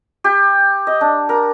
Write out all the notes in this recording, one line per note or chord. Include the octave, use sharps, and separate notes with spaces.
G4
D#5
D4
A#4